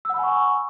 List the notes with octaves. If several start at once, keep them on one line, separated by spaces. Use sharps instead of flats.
F#5 G#5 B5 C#6 E6